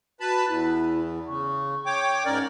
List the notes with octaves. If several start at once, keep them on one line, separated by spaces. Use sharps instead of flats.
F#4 B4 A5 B5
E2 E4
C#3 C#6
C#5 G5 D6
G#2 C#4 A#4 D5